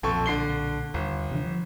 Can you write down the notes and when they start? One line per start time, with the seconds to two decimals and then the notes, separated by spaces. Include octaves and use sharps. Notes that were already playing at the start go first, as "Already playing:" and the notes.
0.03 B1 F2 A#2 A4 C#6
0.26 D3 C7 G7
0.94 G1 D#2
1.31 C3 E3 D4
1.44 F3